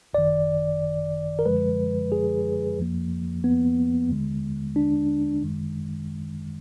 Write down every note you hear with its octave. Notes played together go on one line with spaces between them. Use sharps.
G#1 F#2 D#3 D5
A#4
F#2 D3 F3 G#3 B4
G#4
F2 F3 A#3
B3
D#2 D3 G#3
D4
G#1 F#2 D#3 G#3